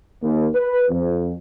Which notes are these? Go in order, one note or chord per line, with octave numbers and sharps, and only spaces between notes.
D#2
B4
F2